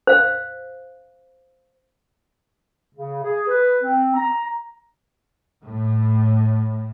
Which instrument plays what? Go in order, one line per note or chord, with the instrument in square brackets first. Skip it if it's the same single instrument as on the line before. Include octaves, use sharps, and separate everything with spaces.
[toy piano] C5 F5
[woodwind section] C#3
G#4
B4
C4
A#5
[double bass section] A2